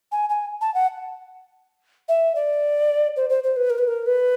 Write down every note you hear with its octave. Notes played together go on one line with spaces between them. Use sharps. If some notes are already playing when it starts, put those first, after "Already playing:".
G#5
G#5
A5
F#5
E5
D5
C5
C5
C5
B4
A#4
B4
A#4
B4